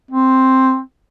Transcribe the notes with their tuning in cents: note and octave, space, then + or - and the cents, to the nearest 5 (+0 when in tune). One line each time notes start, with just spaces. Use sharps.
C4 +5